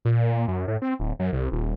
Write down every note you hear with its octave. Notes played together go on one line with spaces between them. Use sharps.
A#2
F#2
A2
C4
D1
F#2
C2
D#1